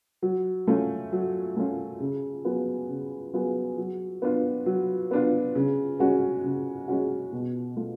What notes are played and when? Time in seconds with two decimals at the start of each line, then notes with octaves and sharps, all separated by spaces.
0.22 F#3
0.67 A3 C#4 F4
1.12 F#3
1.56 A3 C#4 F4
2.00 C#3
2.45 F#3 B3 F4 G#4
2.89 C#3
3.33 F#3 B3 F4 G#4
3.78 F#3
4.22 B3 D4 F4
4.66 F#3
5.11 B3 D4 F4
5.55 C#3
5.99 G#3 C#4 F#4
6.44 C#3
6.88 G#3 C#4 F#4
7.33 B2
7.76 A3 F4